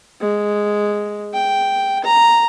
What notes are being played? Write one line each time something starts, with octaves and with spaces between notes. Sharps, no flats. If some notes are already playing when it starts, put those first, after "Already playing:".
G#3
G5
A#5